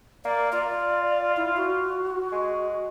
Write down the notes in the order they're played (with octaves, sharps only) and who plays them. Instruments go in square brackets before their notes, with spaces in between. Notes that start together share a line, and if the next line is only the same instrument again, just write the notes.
[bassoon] A#3 [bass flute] D5
[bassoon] F4 [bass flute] D5
[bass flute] E4
F#4
[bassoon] G#3